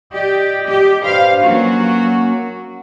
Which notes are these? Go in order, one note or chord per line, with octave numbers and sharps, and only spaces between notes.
G4 D5 D#5 G5
G4
D4 B4 C5 F5
F#3 A#3 C#4 F#4